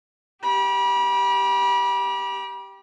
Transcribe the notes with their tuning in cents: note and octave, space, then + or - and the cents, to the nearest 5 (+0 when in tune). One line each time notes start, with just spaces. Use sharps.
G4 +0 B5 -35